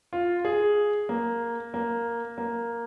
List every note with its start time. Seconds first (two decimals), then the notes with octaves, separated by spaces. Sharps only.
0.13 F4
0.45 G#4
1.09 A#3
1.74 A#3
2.38 A#3